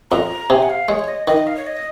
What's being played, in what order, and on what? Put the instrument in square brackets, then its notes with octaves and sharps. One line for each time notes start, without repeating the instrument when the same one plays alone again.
[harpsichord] F2 [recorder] A#5
[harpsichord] C3 [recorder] G#5
[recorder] F#5
F5
[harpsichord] G#3 [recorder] C#5
[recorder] D#5
[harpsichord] D#3 [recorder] D#5
[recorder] F5
C#5
D#5